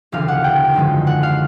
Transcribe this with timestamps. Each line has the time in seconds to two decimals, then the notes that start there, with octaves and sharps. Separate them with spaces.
0.12 E1 D2 C#3 F3 A3 F5
0.28 F#5
0.44 G5
0.74 G#1 F#2 D3 F3 G#3
1.07 F#5
1.23 F5